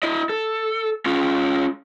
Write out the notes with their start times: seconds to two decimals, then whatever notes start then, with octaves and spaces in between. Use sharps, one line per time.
0.03 E4 D#5
0.30 A4
1.06 C#4 F4